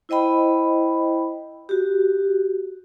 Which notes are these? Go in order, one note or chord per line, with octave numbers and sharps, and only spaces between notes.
E4 C5 D#5 G5 B5
F#4 G4